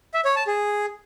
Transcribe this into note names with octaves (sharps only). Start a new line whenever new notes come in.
E5
C#5
A5
G#4